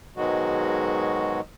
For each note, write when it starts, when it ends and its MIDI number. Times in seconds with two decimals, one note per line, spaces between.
0.16 1.40 44
0.16 1.40 47
0.16 1.40 51
0.16 1.40 54
0.16 1.40 56
0.16 1.40 66